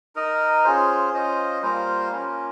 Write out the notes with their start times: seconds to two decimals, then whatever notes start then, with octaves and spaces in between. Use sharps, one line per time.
0.16 D#4 A#4 D#5
0.64 C#4 F4 G#4 C5
1.13 C#4 F4 C5 D#5
1.62 G3 A#3 F4 C5
2.11 A#3 C#4 F4